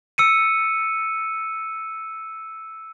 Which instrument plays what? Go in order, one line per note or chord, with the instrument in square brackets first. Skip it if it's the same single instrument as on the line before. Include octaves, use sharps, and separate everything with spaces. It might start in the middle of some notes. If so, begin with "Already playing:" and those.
[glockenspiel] E6 C#7 D#7